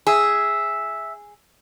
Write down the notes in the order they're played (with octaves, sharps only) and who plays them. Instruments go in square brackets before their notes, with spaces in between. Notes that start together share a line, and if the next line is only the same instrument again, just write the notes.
[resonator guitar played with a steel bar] G#4 [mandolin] E5